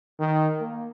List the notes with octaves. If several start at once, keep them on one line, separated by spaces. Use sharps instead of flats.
D#3
A#3